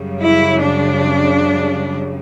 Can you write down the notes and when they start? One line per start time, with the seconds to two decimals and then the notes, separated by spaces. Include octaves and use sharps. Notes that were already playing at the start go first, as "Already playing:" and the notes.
Already playing: F#2 C#3 G3
0.23 E4
0.61 D4